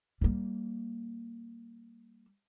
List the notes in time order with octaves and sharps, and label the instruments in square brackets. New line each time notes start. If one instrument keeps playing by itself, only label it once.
[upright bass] G3 A#3